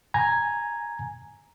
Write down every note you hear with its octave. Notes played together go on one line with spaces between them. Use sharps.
G#5 A#5 G#6